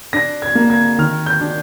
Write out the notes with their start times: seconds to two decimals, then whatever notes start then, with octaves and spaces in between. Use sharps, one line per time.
0.13 D4 A#6
0.42 G#6
0.55 A#3
0.70 G#6
0.98 D#3 F6
1.26 G6
1.41 D4